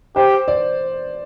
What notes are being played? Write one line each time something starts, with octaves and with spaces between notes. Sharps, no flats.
G4 C5
D5